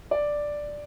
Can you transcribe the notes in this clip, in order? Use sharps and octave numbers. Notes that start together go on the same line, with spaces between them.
D5